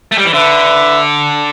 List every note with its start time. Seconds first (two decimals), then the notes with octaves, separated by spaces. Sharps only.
0.12 A3
0.18 G3
0.26 E3
0.33 D3 B4 E5